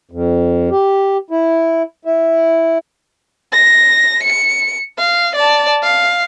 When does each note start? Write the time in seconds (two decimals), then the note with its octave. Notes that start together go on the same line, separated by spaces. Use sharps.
0.11 F2
0.71 G4
1.30 E4
2.05 E4
3.52 A#6
4.23 C#7
4.98 F5
5.36 D5 A5
5.83 F5